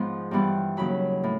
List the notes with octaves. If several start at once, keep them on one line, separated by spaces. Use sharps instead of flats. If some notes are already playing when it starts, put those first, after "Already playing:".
Already playing: G#2 F3 G#3 B3 C6
G2 E3 G3 B3
D#2 C#3 F#3 B5
A2